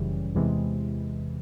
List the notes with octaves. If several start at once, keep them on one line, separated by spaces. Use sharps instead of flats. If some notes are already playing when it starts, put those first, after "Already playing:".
Already playing: G1 F#2 C#3 E3 G3
E2 C3 E3 G#3